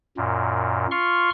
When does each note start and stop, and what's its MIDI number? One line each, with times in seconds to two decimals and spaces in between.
0.17 0.87 42
0.17 0.87 46
0.91 1.30 65
0.91 1.30 84
0.91 1.30 85
0.91 1.30 89